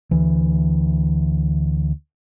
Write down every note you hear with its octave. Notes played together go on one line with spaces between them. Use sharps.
D2 E3